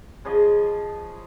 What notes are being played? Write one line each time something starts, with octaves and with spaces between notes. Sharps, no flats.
C#3 F3 G#4 D#5